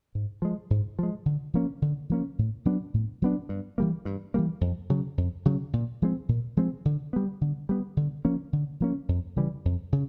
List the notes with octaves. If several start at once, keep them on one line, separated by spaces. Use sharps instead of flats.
G#2
F3 G#3
G#2
F3 G#3
D3
F3 A#3 C#4
D3
F3 A#3 C#4
A2
F#3 B3 D4
A2
F#3 B3 D4
G2
E3 G3 A#3
G2
E3 G3 A#3
F2
C#3 F#3
F2
C#3 F#3
A#2
F3 G#3 C4
A#2
F3 G#3 C4
D3
G3 B3
D3
G3 B3
D3
F3 A#3 C#4
D3
F3 A#3 C#4
F2
C#3 E3 G3
F2
C#3